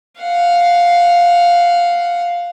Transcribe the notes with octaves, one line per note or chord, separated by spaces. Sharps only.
F5 F#5